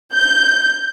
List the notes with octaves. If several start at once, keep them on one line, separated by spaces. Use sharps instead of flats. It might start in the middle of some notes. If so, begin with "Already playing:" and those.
G6